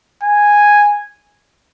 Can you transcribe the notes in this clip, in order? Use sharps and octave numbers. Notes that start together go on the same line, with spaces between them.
G#5